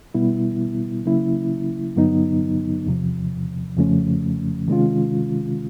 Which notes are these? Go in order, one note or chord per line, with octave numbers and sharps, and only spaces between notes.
B2 G3 B3 E4
C#3 F#3 A#3 C#4 E4
G2 D3 F#3 B3 D#4
E2 C3 F3
F2 C#3 F3 A3 C#4
C3 D#3 G#3 C#4 F4